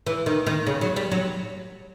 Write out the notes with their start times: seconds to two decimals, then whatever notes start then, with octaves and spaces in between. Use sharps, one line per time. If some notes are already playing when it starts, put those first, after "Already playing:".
0.06 E3
0.26 D#3
0.47 D#3
0.67 C#3
0.81 F#3
0.96 G3
1.11 F#3